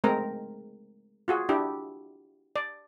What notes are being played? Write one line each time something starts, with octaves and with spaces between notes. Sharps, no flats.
G#3 A3 C4 A#4 A#5
F4 F#4 G#4
D4 E4 G4
D5